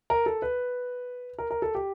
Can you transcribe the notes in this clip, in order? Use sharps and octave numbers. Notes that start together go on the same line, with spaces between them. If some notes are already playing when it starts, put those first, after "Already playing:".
A#4
A4
B4
A#4
A#4
A4
G4